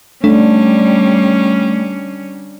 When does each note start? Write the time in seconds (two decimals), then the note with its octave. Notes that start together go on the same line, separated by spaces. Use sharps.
0.24 G3 A3 C#4 D4